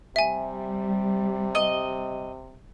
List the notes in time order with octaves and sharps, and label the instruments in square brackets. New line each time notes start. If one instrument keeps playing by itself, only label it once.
[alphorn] C3 [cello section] G3 [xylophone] E5 G#5
[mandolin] D#5